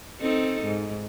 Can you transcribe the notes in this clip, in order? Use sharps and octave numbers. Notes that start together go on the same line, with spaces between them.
C4 D#4 A4
G#2